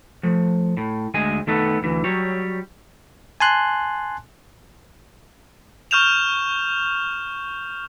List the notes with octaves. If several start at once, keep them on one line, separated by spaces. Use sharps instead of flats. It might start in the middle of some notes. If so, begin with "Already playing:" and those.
F3 A3
A2
D2 G#3 D#5 G#5
D#3 A3 B3 A4
D2 E3
F#3 G3 C#5
G#5 A5 C6 F#6
C#6 F6 G6 E7 F7